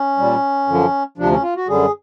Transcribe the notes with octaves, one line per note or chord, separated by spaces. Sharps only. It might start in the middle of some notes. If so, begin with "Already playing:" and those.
Already playing: C#4
A#2 G3
F#2 D3 F3
D2 C3 F3 D4
C#4
F4
F#4
F#2 D3 G3 G#4